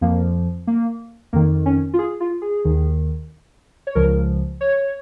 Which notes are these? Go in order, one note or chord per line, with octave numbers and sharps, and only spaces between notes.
F2 F3 A#3
A#3
F2 D#3 A#3
C#4
F4
G#4
F4
G#4
D#2 D#3
C#5
C#2 C#3 F3 A#4
C#5